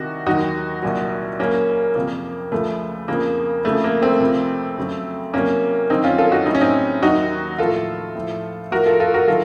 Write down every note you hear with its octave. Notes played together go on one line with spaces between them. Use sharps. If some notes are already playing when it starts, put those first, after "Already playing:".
Already playing: C2 C3 D#3 D#4 F#4
D#2 D#3 F#3 D#4 F#4
C2 A#2 F#3
C#2 C#3 F#3 A#3 C#4
F2 C3 F3 A#3
C#2 C#3 F3 A3
F2 C#3 F3 A#3
F2 C#3 F3 A3
A#3
A3 C4
C#2 C3 F3
F2 C#3 F#3
C2 C3 F#3 A#3 C#4
F#2 D#3 F#3 C4 D#4
C#4 F4
F4 A4
D#4 F#4
A2 F#3 D#4
C#4
C4 D#4
D#2 D#3 F#3 D#4 F#4
A2 F3 F4 A4
A2 F3
A2 F3 F#4 A#4
F4 A4
F4 A4
F#4 A#4
D#3 F#3 F4 A4